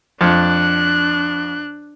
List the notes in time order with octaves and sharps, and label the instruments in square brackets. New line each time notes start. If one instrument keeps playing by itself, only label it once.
[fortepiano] F2 [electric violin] D4 F#6